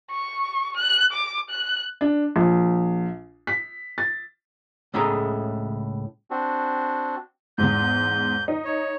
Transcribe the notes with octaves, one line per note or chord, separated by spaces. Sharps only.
C#6
F#6
D6
F#6
D4
A#1
B6
A6
C#2 A2 C#3 A3 G#4 A#5
C4 D4 F#4
E2 G#2 G6
D#4
C#5